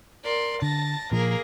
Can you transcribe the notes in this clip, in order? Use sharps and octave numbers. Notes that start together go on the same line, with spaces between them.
A#4 D5 C6
D3 A5 A6 A#6
A#2 F3 A#3 G#4 A#4